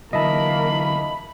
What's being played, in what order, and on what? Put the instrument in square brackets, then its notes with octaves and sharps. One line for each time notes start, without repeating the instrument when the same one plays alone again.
[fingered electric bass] D3 E3 F#3 [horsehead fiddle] A#3 [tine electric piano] D#5 E5 A5 [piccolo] B5